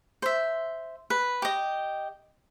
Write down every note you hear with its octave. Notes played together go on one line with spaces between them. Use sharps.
C5 E5
B4
G4 D#5